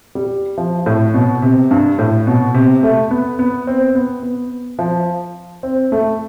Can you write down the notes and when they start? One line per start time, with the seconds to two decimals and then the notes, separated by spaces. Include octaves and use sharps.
0.15 G3
0.57 F3
0.86 A2
1.14 B2
1.42 C3
1.71 G2
1.99 A2
2.27 B2
2.54 C3
2.83 A3
3.11 B3
3.39 B3
3.67 C4
3.95 B3
4.23 B3
4.79 F3
5.63 C4
5.92 A3